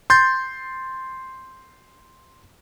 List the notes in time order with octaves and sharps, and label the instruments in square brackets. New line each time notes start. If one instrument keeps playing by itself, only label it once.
[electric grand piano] C6 G6 A6